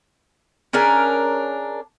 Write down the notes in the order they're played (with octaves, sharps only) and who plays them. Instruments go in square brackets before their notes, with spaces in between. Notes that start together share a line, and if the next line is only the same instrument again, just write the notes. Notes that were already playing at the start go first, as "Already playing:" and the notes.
[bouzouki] C#4 D4 G#4 A#4